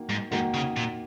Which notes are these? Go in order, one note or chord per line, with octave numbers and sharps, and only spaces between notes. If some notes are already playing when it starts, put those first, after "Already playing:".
Already playing: D#3 A#3 F#4
G#2
G#2 D#3 A#3 F#4
C#3
A#2